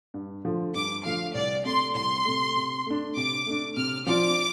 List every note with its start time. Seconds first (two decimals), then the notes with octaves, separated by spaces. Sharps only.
0.14 G2
0.45 D3 F3 A3
0.74 G2 D6
1.04 D3 F3 A3 F5
1.35 C2 D5
1.65 C3 A3 C6
1.95 C2 C6
2.25 C3 A3
2.56 C3
2.86 A3 D4
3.16 C3 D6
3.46 A3 D4
3.77 C3 F6
4.06 F3 C4 F4 D5 D6